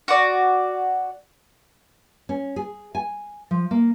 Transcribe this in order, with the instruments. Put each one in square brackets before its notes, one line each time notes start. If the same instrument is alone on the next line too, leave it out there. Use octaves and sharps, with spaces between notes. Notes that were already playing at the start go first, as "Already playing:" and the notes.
[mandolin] F#4 D5
[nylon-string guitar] C#4
G#4
G#5
F3
A#3